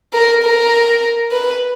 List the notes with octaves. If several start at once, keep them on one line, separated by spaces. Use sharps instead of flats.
A#4
A#4
B4